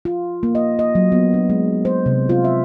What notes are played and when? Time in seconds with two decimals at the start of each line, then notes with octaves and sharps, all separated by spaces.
0.05 F4
0.43 A#3
0.55 D#5
0.79 D#5
0.95 F#3
1.12 B3
1.34 D4
1.49 G#3
1.85 C5
2.06 C3
2.29 F4
2.44 E5